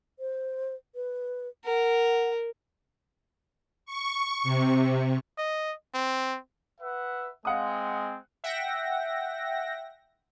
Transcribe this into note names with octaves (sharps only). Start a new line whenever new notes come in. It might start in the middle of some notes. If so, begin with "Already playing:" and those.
C5
B4
A#4 F#5
C#6
C3
D#5
C4
B4 E5 F#5
G#3 C4 F5 F#5 D#6
E5 F#5 G5 A#6